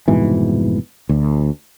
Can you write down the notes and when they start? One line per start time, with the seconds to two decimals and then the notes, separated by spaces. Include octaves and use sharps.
0.08 F1 G#2 B2 E3
1.09 D2